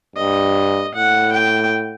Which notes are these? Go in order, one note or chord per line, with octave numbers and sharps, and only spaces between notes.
G2 D#5
A2 F#5
G5